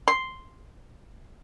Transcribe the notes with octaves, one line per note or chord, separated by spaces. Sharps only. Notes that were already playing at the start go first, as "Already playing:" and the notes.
C6